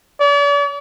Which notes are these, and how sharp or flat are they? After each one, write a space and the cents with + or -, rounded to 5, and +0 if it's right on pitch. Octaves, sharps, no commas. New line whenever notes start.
D5 -45